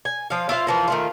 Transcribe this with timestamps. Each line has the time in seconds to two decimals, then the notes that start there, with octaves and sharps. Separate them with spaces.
0.05 G#5
0.30 F3 F5
0.49 E4 F4 C5 F5
0.67 E3 F3 A#4
0.88 D#3 A3 F4